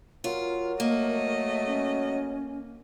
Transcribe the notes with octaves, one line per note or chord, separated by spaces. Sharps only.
F#3 F4 A#4
A3 A#3 D#5
C#4